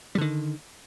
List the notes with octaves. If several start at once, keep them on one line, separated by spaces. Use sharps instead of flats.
D3 D#3 G3